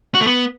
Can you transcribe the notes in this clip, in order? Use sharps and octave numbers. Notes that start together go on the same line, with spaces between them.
F#4
A3
B3